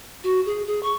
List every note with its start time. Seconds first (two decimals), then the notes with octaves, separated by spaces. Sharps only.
0.24 F#4
0.46 G#4
0.67 G#4
0.83 C#6